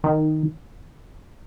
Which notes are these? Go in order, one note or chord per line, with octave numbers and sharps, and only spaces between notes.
D#3